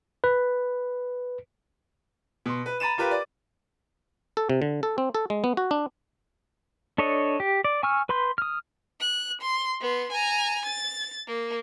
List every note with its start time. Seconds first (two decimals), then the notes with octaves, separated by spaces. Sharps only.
0.24 B4
2.46 B2 C6
2.66 B4
2.80 A#5 B5 A6 D#7 E7
2.98 F4 G4 A#4 B4
3.11 D5
4.37 A4
4.49 C3
4.62 D3
4.83 A4
4.98 C4
5.15 A4
5.30 G#3
5.44 B3
5.57 F#4
5.71 D4
6.98 D4 A4 C#5 D#5
7.40 G4
7.64 D5
7.83 G#5 C#6 E6 F6
8.09 B4 B5 C6 G6
8.38 D#6 F6
9.00 F#6
9.41 C6
9.81 B3 C6
10.12 G#5 A#5
10.65 A6
11.27 A#3